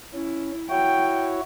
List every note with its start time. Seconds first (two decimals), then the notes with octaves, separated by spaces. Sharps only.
0.14 C#4 E4
0.70 E4 F#4 C#5 G5